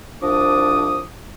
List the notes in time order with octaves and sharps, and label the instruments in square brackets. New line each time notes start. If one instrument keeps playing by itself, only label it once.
[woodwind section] C2 F3 D4 D6 D#6